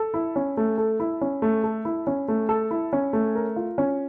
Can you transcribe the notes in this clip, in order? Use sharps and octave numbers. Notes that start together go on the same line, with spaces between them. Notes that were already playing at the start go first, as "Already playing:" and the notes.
Already playing: A4
E4
C#4
A3
A4
E4
C#4
A3
A4
E4
C#4
A3
A4
E4
C#4
A3
A#4
F4
C#4